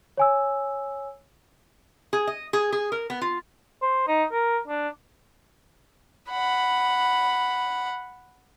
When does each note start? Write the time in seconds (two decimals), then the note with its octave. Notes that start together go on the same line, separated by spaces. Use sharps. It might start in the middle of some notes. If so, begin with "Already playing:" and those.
0.18 C#5 G#5 E6
2.13 G#4
2.27 D#5
2.53 G#4
2.72 G#4
2.92 A#4
3.10 B3
3.22 F4
3.82 C5
4.08 D#4
4.32 A#4
4.67 D4
6.30 F#5 B5